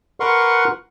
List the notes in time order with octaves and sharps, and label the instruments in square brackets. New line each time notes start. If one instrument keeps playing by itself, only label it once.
[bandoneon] A#4 B4 F#5 C6 C#6